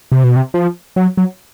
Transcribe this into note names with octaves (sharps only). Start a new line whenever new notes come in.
C3
B2
C3
F3
F#3
F#3